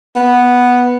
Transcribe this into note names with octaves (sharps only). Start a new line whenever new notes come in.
B3